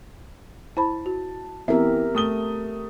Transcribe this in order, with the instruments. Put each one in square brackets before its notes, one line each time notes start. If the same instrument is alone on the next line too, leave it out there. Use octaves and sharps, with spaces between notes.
[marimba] E4 C5 B5 [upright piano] A5
[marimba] F#4
[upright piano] E3 [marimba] B3 C4 [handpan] G4 A#4 E5
[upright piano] A3 D#6 G7